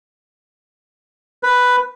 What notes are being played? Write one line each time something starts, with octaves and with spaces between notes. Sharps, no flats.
B4